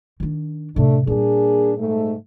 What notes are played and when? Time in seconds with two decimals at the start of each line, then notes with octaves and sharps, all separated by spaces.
0.20 D#3 D4
0.76 A2 C3 A3 D4
1.07 A#2 G3 A#3 D4 G#4
1.77 G#2 A3